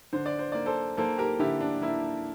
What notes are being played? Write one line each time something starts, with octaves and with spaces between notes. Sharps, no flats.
D3 C5
D5
C5
A#3 D5
A4 C5
A#3 A4 C5
G4 A#4
D3 E4 G4
D4
A#3 E4